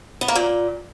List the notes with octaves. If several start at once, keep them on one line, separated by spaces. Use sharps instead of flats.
B3
A#3
A#2